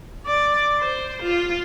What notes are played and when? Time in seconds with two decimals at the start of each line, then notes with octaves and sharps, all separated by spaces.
0.26 D5
0.80 C5
1.22 F4